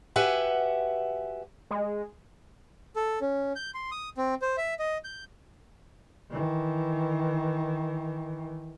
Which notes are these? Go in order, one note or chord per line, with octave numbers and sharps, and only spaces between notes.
F#4 G4 B4 E5 F#5 G#5
G#3
A4
C#4
G6
C6
D#6
C4
C5
E5
D#5
G6
D#3 E3